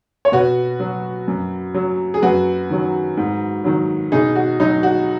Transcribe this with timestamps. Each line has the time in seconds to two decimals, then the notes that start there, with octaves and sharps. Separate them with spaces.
0.25 C#5
0.32 B2 F#4 B4
0.80 F#3
1.28 F#2
1.74 F#3
2.14 G#4
2.22 F#2 F#4 B4
2.70 D#3 F#3
3.17 G#2
3.64 D#3 F#3
4.12 B2 D#4 G#4
4.35 F#4
4.60 F#3 D#4
4.83 F#4